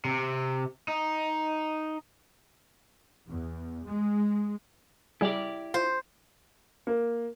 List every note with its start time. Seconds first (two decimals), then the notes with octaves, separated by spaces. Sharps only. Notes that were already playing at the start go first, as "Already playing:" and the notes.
0.05 C3
0.88 D#4
3.27 E2
3.85 G#3
5.21 G3 E4 G4 G#4 D5
5.74 F4 C5
6.87 A#3